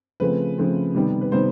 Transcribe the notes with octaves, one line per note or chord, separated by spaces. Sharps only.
C#3 F3 A3 C4 B4
C#3 F3 A3 C4
C3 D#3 G3 B3
B4
C3 D#3 G3 B3 C5